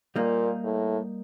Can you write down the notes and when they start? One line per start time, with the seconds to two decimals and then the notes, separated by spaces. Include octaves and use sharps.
0.16 A#2 G3 A#3 D#4
0.64 A2